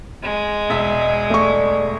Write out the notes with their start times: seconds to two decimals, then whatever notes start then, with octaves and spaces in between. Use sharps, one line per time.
0.23 G#3
0.70 E1 D#5 E5
1.30 A3 D5 C#6